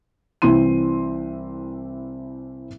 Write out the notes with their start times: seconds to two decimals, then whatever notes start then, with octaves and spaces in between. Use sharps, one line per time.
0.42 C2 E3 C4 E4 C6 D#7